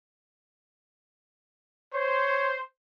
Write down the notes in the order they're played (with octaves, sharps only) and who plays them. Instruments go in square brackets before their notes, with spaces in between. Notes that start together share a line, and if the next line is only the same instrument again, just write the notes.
[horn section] C5 [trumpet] C#5